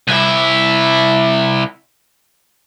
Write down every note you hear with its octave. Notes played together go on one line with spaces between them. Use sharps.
C2 E4